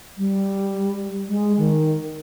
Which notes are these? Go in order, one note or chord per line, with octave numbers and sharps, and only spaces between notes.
G3
G#3
D#3